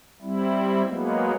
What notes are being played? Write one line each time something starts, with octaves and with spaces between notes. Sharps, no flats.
G3 C4 E4
F#3 G#3 A#3 B3